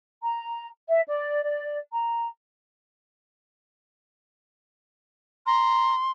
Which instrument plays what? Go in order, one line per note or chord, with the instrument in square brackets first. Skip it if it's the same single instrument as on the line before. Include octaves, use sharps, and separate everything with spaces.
[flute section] A#5
E5
D5
D5
A#5
[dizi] A#5 [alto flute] C6